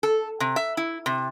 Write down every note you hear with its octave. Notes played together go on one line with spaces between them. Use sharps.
A4
C3
E5
E4
C3